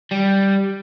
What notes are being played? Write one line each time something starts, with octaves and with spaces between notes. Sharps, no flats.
G3